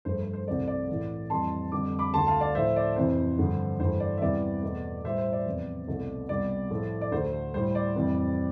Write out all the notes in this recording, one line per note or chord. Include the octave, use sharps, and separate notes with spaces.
G2 F3 A3 C5
C5
C5
C2 C3 F3 A3 D5
D5
A2 E3 A3
F2 E3 G3 A5 C6
F2 D3 G3 D6
B5 D6
D2 D3 A3 A5 C6
F5 A5
D5 F5
A2 F3 A3 C5 E5
D5
F2 C3 E3 C5
G2 D3 F3
G2 E3 A3 C5
D5
E5
E2 C3 E3 G3 D5
E2 B2 A3
A2 G3 C5 E5
C5
D5
E2 C3 F3
C2 B2 A3
C2 B2 G3 D5
A2 F3 A3
D5
D2 D3 A3 C5
A2 G3 C5
D5
F2 C3 E3 G3